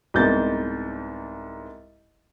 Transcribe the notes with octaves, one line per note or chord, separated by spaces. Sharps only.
C2 G#2 B3 G6 A6